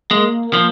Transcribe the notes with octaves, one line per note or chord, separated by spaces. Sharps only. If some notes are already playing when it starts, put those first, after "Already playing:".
G#3 A#3
F3